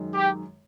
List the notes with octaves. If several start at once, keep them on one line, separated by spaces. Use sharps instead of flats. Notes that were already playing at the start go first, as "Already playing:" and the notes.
Already playing: F#2 D#3 G#3
G4